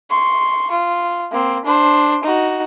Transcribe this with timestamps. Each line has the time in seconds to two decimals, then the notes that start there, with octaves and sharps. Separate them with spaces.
0.10 C6 C#6
0.71 F4
1.32 A#3 C4
1.65 D4 C5
2.23 D#4 F#4